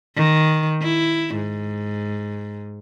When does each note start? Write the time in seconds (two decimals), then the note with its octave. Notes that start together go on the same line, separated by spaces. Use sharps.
0.16 D#3
0.82 E4
1.35 G#2